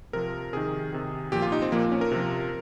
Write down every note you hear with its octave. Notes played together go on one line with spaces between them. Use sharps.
C3 F3 A#4
C3 D#3 G#4
C3 D#3
A#2 F3 G4
F4
D#4
C4
A#2 F3 A#3
C#4
A#4
C3 F3